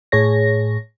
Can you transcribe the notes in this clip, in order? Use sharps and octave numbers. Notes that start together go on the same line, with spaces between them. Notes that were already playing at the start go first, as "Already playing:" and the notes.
A2 G#4 C#5 A#6